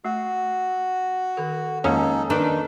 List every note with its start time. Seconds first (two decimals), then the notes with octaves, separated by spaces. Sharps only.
0.05 A3 F#4
1.37 D#3 A4
1.84 F2 D#3 G#3 A#3 C#4 D#4 G#4 A4
2.30 D#3 D4 D#4 A4 B4